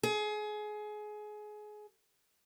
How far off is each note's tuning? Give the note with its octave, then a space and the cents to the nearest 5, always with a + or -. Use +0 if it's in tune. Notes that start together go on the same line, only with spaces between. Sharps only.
G#4 +25